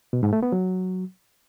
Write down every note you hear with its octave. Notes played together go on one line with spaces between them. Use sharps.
B2
G#2
A3
B3
F#3